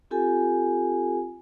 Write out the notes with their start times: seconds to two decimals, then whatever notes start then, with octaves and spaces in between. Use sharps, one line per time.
0.11 C4 F4 G4 A4 G#5